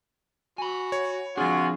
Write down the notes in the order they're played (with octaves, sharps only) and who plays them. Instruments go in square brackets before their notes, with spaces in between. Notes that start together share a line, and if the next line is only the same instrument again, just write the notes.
[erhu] F#4 [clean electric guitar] G#5 B5
[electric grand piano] C#5
[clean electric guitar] F3 C4 D4 [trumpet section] F4 F#4 [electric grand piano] G#4 [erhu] G#5